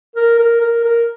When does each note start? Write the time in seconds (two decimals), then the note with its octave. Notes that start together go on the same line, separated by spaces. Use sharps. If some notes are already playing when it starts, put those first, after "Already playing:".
0.16 A#4
0.39 A#4
0.61 A#4
0.84 A#4